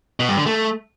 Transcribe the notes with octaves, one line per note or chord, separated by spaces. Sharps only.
B2
G2
D3
A3